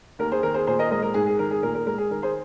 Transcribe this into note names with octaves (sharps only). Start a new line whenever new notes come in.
D#2 A#4
G#4 C5
D#3 A#4
G#4 C5
A#2 G#4 C5
A#4 D#5
G#3 A#4 D#5
A#4
G#2 G#4
G#4
D#3 A#4
G#4
A#2 A#4
A#4
G#3 A#4
G#4
D#3 A#4
G#4 C5